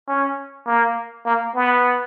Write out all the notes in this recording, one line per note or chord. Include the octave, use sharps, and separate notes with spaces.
C#4
A#3
A#3
B3